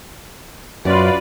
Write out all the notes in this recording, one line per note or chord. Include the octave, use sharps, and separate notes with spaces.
F#2 F4 B4 D5